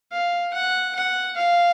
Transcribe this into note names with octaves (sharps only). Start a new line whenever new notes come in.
F5
F#5
F#5
F5